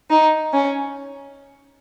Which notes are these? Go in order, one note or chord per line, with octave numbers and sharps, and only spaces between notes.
D#4
C#4